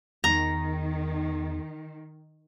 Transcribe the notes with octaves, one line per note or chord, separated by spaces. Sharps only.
E2 D#3 A#5